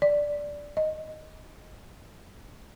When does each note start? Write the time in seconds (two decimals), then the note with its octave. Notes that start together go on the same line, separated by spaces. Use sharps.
0.02 D5
0.77 D#5